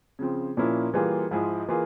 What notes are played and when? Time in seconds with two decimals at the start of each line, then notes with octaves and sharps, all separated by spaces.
0.19 C#3 F3 C4
0.57 A#2 F3 A#3 C#4 E4
0.94 E3 G3 A#3 F4 G#4
1.31 G#2 F3 G#3 E4 G#4
1.68 E3 A#3 F4 G#4